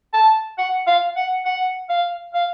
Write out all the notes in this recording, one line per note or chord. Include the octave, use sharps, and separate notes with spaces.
A5
F#5
F5
F#5
F#5
F5
F5